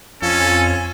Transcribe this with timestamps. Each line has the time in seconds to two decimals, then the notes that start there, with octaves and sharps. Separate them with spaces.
0.22 F2 C#4 F4 A4 G#5